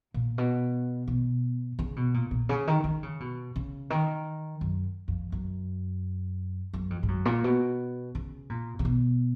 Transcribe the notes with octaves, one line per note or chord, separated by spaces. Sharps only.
A#2
B2
B2
C#3
B2
A#2
A#2
C#3
D#3
D#3
C#3
B2
C#3
D#3
F#2
F2
F#2
F#2
F2
G#2
F#2
A#2
B2
C#3
A#2
C#3
B2